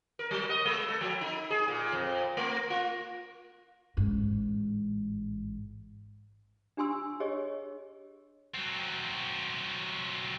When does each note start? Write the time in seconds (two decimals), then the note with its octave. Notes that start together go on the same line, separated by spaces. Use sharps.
0.19 A#4
0.31 F#3
0.49 D#5
0.65 G#3
0.89 A4
1.01 F3
1.21 D#4
1.50 G#4
1.68 A#2
1.92 F2
2.37 A3
2.70 F4
3.97 A1 G#2
6.77 D4 G4 G#5 C6 E6
7.20 G4 G#4 C#5 D#5
8.54 F#3 C4